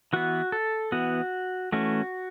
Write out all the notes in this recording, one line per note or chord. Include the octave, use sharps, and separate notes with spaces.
E3 B3 F#4
A4
E3 B3 F#4
E3 A3 C#4 F#4